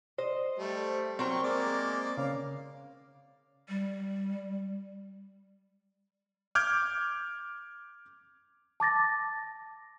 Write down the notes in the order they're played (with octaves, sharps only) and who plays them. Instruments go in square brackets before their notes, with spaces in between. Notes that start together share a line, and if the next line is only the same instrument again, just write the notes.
[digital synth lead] C5 [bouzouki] D#5
[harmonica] G3 A3
[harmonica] F#3 C#6 [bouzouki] C4 A#4 G5
[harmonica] G#3 A#3 D5
[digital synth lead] C#3 [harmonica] F5
[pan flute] G3
[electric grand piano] D6 F6 G6 G#6
[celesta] A5 D6 A6 A#6